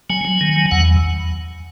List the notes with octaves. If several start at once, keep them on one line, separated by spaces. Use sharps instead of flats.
F#3 G#5
F#3
D#3
F#3
E2 F#5